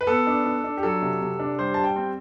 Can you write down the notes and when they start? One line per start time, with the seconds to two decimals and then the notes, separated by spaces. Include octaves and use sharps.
0.01 B4
0.07 B3 A4
0.27 D4
0.45 D4
0.64 D4
0.77 G4
0.83 F#3 A4
1.02 C3
1.21 C3
1.39 D4
1.58 G3 C5
1.74 G3 A5
1.84 G5
1.96 C4